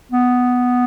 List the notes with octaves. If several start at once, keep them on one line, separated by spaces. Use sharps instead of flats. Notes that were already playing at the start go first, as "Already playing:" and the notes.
B3